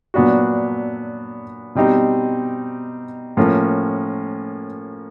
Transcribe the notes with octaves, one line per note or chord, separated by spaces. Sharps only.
A#2 F#3 B3 D4 F#4
B2 G3 C4 D#4 G4
A2 F3 A#3 C#4